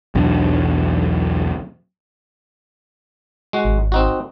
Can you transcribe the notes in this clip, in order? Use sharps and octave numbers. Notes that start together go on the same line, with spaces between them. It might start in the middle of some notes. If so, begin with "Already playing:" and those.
B1 E2 F#3 D4
G#3 F#4
G#1
C4 D#4 F#4